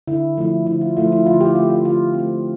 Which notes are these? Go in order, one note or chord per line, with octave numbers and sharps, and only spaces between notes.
D3 E4
F3 A3 E4
D3 E4
F4
F3 A3 E4 F4
E4
D3 F4
E4 G4
A3 C4 F4
F4
D3 F4
C4
A3